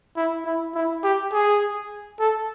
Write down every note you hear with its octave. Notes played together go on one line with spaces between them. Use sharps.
E4
E4
E4
G4
G#4
A4